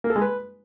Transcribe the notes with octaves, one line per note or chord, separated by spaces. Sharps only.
A#3
A4
G#3
B4